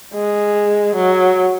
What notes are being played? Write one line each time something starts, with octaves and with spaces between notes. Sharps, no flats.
G#3
F#3